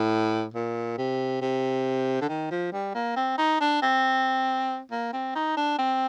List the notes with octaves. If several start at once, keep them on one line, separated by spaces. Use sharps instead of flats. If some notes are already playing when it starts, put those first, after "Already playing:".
Already playing: A2
A#2
C3
C3
D3
D#3
F3
G3
A#3
C4
D#4
D4
C4
A#3
C4
D#4
D4
C4